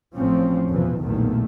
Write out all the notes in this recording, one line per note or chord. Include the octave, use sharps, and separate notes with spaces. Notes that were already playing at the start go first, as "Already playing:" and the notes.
A1 A2 F3 C4 C#4
F1 E2 B2 E3 F3
B1 E2 A#2 D#3 A3